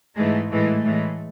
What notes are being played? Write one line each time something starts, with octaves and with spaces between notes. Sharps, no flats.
G#2 E3 G#3 A3
A2 E3 G#3 A3
A2 E3 G#3